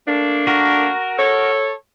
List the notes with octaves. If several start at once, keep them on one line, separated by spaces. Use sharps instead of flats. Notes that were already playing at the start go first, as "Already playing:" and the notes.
A3 A#3 D4
F#4 A#4
A4 C#5